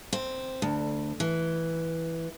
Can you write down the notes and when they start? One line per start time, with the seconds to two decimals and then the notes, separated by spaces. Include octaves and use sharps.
0.13 C4
0.62 D2
1.20 E3